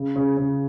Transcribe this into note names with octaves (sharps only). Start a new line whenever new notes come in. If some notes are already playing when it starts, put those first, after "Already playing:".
Already playing: C#3
C#3
C#3